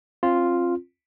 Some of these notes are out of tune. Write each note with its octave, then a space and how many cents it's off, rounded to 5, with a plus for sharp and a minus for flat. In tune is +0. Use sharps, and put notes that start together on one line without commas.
C4 +35 F4 +0